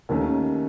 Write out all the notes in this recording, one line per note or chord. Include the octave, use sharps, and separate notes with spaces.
D#2 D#3 A3 C#4